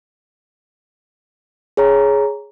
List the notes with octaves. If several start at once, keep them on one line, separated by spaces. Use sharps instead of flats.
G#4 C#5 A#5